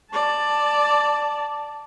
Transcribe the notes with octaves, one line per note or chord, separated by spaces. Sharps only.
D5 A5